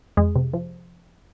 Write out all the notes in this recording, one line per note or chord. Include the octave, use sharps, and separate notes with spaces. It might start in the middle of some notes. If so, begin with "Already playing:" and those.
F2 G#3 G#4
C3
F3